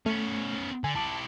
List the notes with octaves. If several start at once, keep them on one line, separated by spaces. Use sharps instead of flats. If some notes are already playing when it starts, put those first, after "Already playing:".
A3 B3 C#4
D3 G#5
E4 G4 A5